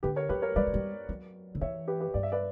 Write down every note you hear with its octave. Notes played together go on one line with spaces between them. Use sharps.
D3 G4 B4
A#4 C#5
F#3 G4 B4
A#4 C#5
G3 B4 D5
F#3
G3
F#3
D3
E3 C#5 E5
G4 B4
G4 B4
G2 D5
E5
B4 D5